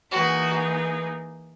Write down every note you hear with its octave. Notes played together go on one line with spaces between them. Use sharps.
E3 A#3 D#4 F#4 G#4 B4